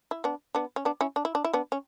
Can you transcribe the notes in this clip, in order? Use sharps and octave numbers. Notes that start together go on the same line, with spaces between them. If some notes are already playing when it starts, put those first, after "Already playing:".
E4
B3 D4
B3 D4
C#4
B3 D4
C#4 E4
D4
E4
D4
E4
B3 D4
C#4